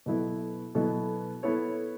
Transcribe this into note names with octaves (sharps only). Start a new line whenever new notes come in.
B2 F#3 B3 E4 A4
B2 F#3 B3 E4 A4
B3 E4 A4 C#5